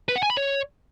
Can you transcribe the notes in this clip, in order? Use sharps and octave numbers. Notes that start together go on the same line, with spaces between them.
B4
F#5
G#5
B5
C#5